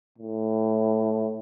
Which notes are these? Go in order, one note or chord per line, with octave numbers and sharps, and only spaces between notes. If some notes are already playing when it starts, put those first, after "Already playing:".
A2